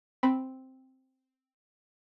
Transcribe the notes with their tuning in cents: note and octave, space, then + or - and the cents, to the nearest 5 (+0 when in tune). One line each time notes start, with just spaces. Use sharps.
C4 +0 B5 +0